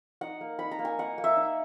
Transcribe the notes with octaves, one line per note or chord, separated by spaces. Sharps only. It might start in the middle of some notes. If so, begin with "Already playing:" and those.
D#4 F#5
A#3
D#4 B5
A#5
A#3
G#5
D#4 F#5
A#3
E5
D#4